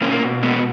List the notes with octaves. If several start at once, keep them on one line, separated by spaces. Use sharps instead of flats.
B2 A#3 C#4
A#3
B2
G#3 B3